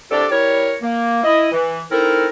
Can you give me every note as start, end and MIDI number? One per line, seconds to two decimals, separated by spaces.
0.11 0.26 36
0.11 0.26 62
0.11 0.26 67
0.11 0.26 69
0.11 0.26 74
0.30 0.74 55
0.30 0.74 64
0.30 0.74 70
0.30 0.74 73
0.83 1.20 58
1.24 1.48 64
1.24 1.48 75
1.52 1.82 52
1.91 2.28 60
1.91 2.28 63
1.91 2.28 64
1.91 2.28 69
1.91 2.28 70